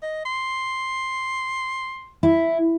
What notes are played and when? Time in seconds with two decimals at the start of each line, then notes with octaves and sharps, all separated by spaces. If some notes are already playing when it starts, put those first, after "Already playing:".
0.02 D#5
0.25 C6
2.23 E4